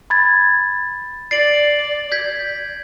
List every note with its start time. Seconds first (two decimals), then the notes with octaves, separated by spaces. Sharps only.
0.10 B5 G#6 A6
1.31 D5 A6 C7 D7 F#7
2.12 G6 G#6 B6